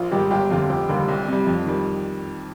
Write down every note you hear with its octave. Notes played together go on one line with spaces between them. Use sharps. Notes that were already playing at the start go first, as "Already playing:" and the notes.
Already playing: A#1 F4
G#2 D#3 G3 G4
G1 G4
F2 D3 F4
F1 G4
D#2 D3 G3
C2
C3 G3
F2
D#3 G3